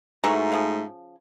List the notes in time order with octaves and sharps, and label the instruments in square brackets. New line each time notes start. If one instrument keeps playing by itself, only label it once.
[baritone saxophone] G#2 [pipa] E3 A#5 C#6 [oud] A3 F#4
[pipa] C#3 F3 F5